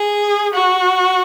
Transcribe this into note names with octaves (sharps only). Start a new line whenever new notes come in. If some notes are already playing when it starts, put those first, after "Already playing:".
Already playing: G#4
F#4